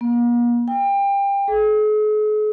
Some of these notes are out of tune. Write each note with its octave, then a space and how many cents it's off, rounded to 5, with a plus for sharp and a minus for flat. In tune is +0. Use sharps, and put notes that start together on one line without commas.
A#3 +45
G5 +25
G#4 +45